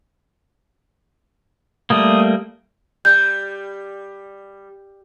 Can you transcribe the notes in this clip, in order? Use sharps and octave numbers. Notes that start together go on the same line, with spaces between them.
G3 A3 A#3 D#6
G3 G6